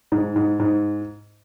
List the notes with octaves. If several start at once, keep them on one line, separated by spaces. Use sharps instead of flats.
G#2 D#4
G#2
G#2